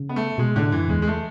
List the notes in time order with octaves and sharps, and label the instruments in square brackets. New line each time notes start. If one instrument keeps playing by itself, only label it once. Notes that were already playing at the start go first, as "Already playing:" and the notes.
Already playing: [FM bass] C#3
[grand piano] B3
A3
[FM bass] B2 [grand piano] G#3
[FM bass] A2 [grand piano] D3
[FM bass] F#2 [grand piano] E3
[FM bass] E2 [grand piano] G#3
[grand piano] G#3
A3